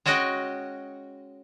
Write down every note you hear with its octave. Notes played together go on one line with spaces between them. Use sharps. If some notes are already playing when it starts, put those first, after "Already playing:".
G#3 C#4 F#4 D#5 G5